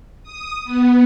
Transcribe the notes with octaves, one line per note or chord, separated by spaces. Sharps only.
D#6
B3